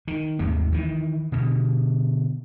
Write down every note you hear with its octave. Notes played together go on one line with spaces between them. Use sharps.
D#3
G#1 D#2 C3 A3
D#3 E3
B2 D3